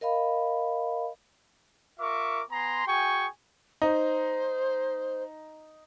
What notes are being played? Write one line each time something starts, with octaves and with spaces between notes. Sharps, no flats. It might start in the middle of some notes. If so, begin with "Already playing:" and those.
A#4 D#5 F5 B5
F4 A#4 E5 C#6 D6
B3 G#5 A#5 C6
F#4 G#4 G5 G#5 C#6
D#4 C5